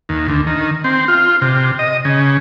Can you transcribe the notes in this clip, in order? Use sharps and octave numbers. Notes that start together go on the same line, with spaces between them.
D#2
D2
D#3
C4
F4
C3
D#5
C#3